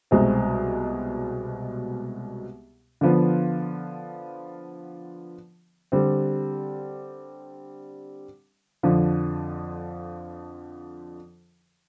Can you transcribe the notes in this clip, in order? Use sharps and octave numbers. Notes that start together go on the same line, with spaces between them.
C2 B2 G#3 C4
D3 F3 B3 F4
D3 G3 C4
F2 D3 F3